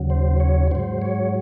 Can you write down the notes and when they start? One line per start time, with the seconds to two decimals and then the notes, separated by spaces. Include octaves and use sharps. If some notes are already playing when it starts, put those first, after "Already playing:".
Already playing: D#2 C#3 F#3
0.10 C5
0.40 C#5
0.71 G#2 F#3 C5
1.01 C#5